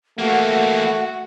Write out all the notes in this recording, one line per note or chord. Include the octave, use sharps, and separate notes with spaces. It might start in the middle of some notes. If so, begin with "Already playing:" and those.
E3 A3 A#3 F#4 F#5